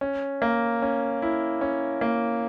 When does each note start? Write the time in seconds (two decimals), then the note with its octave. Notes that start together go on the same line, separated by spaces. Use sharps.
0.01 C#4
0.42 A#3
0.82 C#4
1.22 E4
1.61 C#4
2.01 A#3